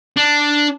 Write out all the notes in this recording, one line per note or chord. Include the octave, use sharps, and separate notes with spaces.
D4